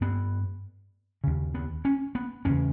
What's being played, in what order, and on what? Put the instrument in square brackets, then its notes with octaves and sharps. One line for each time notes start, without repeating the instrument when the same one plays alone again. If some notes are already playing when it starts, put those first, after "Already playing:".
[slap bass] G2 B3
D#2 C#3
B3
C#4
B3
E2 C#3 C#4